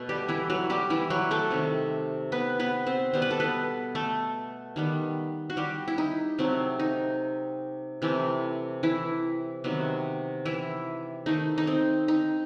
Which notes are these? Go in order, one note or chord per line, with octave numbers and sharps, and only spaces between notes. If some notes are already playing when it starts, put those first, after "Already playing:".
Already playing: B2 A3
G3 G4
E3 E4
F#3 F#4
G3 G4
E3 E4
F#3 F#4
A3 A4
C3 D#3 G3
B3 B4
B3 B4
C4 C5
B2 G3 B3 C5
B4
A4
B3 B4
A3 A4
D#3 G3 B3
F#4
G3 G4
E4
D#4
C3 F#3 A3 C4
D#4
C3 E3 A3
E3 E4
C3 D#3 F#3 B3
E3 E4
D#3 A3 D#4
D#4
C4
D#4